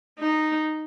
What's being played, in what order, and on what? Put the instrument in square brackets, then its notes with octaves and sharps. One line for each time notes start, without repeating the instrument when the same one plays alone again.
[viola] D#4